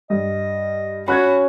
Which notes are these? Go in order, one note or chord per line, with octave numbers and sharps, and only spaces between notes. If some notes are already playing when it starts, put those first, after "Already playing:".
G2 D#5
C#4 F#4 B5 F#6 G#6